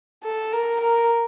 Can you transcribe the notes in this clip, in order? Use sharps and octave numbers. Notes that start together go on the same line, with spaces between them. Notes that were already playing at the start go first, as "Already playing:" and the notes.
A4
A#4
A#4